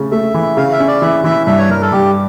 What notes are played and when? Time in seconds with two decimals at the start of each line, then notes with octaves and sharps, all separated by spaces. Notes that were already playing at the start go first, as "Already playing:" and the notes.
Already playing: C#3 A3
0.11 A3 E5
0.34 E3
0.57 C#3 F5
0.72 E5
0.80 C#4
0.87 D5
1.02 E3 E5
1.24 E3 E5
1.47 G2 E5
1.58 C#5
1.69 G2 A#4
1.81 A4
1.92 G2 G4